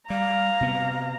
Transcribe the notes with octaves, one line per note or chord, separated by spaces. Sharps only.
G3 F5 A#5
C3 B3